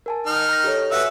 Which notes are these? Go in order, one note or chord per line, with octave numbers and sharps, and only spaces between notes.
A#4 G#5 A5
D#3 D#4 F6
A#5 G6 A#6
G4 A4 C#5
F#4 B4 E5 G#5 E6